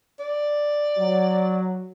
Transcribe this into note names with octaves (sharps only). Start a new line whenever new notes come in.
D5
F#3